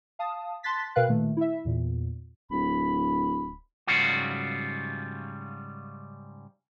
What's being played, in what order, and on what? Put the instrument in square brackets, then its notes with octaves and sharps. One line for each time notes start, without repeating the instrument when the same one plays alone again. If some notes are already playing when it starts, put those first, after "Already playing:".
[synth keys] F5 A5 D#6
A5 C6 F#6 A6 B6
B2 A#4 B4 F5 G5 F#6
A#2 D#3 A3
E4 E5
E2 A#2
[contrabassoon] D1 [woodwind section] B5
[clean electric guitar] G#2 C#3 F#3 G3 F4 F#4